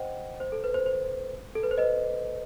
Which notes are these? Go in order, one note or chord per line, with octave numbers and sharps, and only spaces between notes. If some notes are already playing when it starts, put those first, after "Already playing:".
Already playing: C5 D#5 F#5 G5
C5
A4
B4
C5
C5
A4
B4
C5
B4 D#5